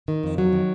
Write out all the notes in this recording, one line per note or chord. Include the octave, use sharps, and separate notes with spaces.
D#3
F2
F#3
D#3